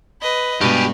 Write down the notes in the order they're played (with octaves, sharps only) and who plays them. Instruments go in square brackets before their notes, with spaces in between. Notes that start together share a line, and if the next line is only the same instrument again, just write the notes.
[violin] B4 D#5
[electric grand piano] G2 [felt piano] B2 G#3 [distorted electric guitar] G4 G#4 [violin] B4